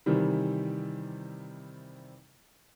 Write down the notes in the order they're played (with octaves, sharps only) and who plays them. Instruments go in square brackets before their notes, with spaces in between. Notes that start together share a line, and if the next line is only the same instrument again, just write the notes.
[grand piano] C3 D#3 E3 G3